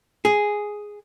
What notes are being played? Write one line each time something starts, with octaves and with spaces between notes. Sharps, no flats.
G#4